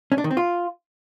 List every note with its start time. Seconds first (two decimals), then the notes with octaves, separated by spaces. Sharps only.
0.12 C#4
0.18 D4
0.24 D#3
0.31 C4
0.37 F4